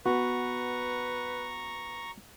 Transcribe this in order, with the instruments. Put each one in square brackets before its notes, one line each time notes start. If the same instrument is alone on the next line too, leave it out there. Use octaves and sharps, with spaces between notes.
[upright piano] B3 [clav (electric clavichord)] F#4 [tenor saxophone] B4 [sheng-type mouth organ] A#5 C#6